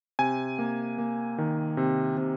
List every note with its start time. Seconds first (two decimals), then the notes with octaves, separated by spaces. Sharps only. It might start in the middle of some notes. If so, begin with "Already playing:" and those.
0.19 C3 G#5
0.58 A#3
0.98 A#3
1.38 D#3
1.77 C3
2.17 C3